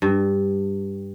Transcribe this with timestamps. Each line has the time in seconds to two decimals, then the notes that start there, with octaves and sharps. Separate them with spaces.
0.02 G2